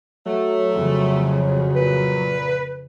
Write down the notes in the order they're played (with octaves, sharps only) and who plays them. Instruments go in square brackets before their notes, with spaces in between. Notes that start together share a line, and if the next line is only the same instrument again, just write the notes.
[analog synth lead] F#3 [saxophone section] A3
[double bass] F2 C#3
[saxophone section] A#2 [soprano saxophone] B4